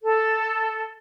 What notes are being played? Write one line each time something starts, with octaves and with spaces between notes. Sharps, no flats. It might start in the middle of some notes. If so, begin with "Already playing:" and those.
A4